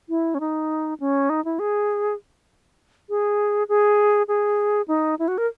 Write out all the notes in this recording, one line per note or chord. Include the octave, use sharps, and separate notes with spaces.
E4
C#4
D#4
C#4
D#4
E4
G#4
G#4
G#4
G#4
D#4
E4
F#4
A#4